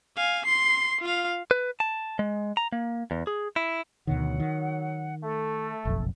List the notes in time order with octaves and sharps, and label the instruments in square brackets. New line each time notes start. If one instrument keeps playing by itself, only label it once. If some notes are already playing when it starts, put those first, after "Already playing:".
[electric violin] F5 G#5
C6 C7
F4 F5
[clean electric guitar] B4
A5
G#3
A#5
A#3
E2
G#4
E4
[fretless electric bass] D2 B2 D#3 [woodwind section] F#3 F#5
[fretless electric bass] D#3
[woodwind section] A3 A4
[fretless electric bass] F#1 B1 F2